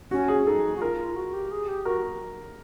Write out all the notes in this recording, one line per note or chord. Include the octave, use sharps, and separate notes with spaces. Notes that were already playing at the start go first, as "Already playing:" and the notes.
C#4 F#4
G#4
D#4 A4
F#4
F4 A#4
F#4
G4
G#4
G4
F#4 A#4